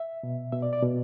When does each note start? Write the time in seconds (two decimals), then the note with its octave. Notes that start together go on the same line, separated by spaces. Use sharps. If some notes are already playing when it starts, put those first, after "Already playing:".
Already playing: E5
0.23 B2
0.52 B2 E5
0.62 D5
0.73 D5
0.83 B2